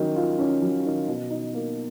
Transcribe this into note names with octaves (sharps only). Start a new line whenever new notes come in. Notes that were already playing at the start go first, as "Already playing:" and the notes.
Already playing: D#3 F#3 C#4
F4
C#4
F#3
D#3
B2
D#4
A#3